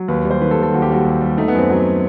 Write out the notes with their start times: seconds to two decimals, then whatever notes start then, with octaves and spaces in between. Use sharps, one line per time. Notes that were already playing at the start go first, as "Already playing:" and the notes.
Already playing: F#3
0.08 D#2 B4
0.25 G3
0.30 C5
0.41 D#3 B4
0.51 A4
0.58 D#2
0.63 A4
0.73 D#2 F#4
0.82 G4
0.90 G3 F#4
1.05 D#2
1.21 G3
1.38 A3 D#4
1.48 B3
1.54 F#2 C4
1.70 F#3